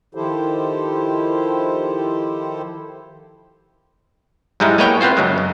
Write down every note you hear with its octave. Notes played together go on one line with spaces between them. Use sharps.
D#3 F3 E4 G4 A4 C5
G#2 G3 G#3 D#4 E4
G#3 A#3 B3 B4 C#5 G5
B3 C4 F4 C5
F#2 C#3 F#3 G#3
F#2